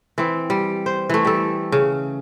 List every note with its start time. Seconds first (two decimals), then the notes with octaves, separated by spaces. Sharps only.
0.18 E3 C4
0.50 G3
0.86 C5
1.09 E3 A3
1.25 G3 A4
1.72 C#3